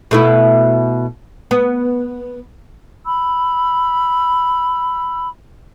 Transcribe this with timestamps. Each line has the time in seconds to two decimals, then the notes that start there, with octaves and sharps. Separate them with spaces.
0.11 B2 A3 E4
1.51 B3
3.05 B5 E6